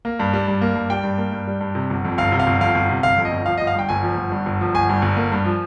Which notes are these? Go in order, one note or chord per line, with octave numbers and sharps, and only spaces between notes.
A#3
G2
G3
G2
A#3
G2
G3 G5
G2
A#3
G2
G3
G2
C3
G1
F2
G1 F5
C3
F5
G1
F2 F5
G1
C3
G1 F5
F2
D#5
G1
F3 F5
D#5
G1
F5
G2 G5
G1 G#5
F3
G1
G2
G1
F3
G1 G#5
G2
G1
A#3
G2
F3